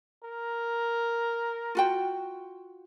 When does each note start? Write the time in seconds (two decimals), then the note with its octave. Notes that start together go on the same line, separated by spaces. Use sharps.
0.23 A#4
1.75 F4 F#4 G5